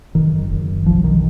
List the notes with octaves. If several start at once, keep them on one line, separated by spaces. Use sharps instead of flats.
F#1 D#3
F#1
B1 F3
D#3